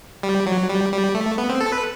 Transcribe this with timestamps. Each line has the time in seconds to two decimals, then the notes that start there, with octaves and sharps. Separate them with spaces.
0.23 G3
0.46 F#3
0.69 G3
0.92 G3
1.15 A3
1.38 B3
1.49 C4
1.61 A4
1.72 B4